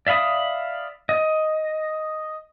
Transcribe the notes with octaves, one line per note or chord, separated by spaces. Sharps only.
D5 E5 F5 B5 D#6
D#5